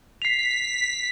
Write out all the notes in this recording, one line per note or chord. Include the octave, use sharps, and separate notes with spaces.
B6 C7 F7